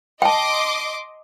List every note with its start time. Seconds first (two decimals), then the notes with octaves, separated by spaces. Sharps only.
0.22 D#5 G5 A5 C6 D6